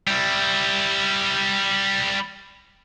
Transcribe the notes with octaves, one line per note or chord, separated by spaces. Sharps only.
G3 E4